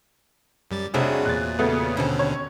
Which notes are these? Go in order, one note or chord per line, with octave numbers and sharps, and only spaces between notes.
F#2 G3 A6
F1 C3 F#3 A3 D4 F#4 G#4
E2 A#2 F#6 A6
C#3 A3 B3
D#2 B2 D3 C4 C#4
C#5